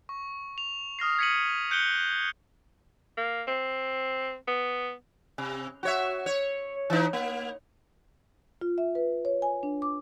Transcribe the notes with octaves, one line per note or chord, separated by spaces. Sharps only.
C#6
F7
D#6 F6 A#6 C7
G#6 B6 C#7 D#7 F#7
F#6 G6 C#7 D7 F#7 G7
A#3
C4
B3
C3
F#4 C#5 E5
C#5
E3 D#4
A#3
F4
E5
B4
C#5
G#5
D4
D6